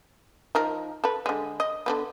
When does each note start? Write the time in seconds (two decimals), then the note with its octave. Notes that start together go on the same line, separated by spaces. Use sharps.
0.55 F3 D#4 A#4
1.04 A4 B4
1.26 D3 G#3
1.60 D#5
1.86 D3 G#3 B3